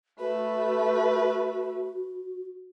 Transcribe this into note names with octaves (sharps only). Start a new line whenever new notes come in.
A3 F#4 B4